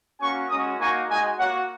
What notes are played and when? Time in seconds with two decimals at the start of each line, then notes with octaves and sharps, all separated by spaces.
0.20 A#3 C#4 F#4 G#5 C#6
0.49 G#3 C#4 F#4 A#5 D#6
0.79 A#3 D#4 F#4 G#5 C#6
1.09 G#3 D#4 F#4 D#5 G#5
1.39 A#3 F#4 C#5 F#5